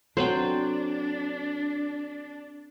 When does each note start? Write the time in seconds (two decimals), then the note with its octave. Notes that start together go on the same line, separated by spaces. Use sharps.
0.17 F#3 C4 D4 A4 B4 C5 G5